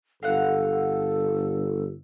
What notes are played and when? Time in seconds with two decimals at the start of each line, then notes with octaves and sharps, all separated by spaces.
0.23 G1 A4 F5 F#5